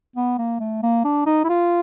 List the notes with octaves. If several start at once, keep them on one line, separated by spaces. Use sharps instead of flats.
B3
A#3
A3
A#3
D4
D#4
E4
F4